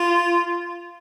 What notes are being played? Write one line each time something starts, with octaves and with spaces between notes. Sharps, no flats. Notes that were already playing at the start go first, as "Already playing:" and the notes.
Already playing: F4